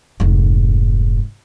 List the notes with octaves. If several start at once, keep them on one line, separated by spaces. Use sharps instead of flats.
F1 G#2